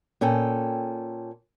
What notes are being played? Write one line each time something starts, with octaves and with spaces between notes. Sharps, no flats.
A#2 C#4 A4 G5